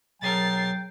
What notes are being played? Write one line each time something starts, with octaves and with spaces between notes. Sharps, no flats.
B1 F#3 G#4 A#4 G5 A6 C7